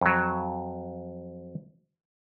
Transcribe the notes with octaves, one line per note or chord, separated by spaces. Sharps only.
F2 F#3